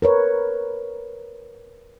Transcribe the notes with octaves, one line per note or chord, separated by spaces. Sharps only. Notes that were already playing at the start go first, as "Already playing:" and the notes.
A#4 B4 C#5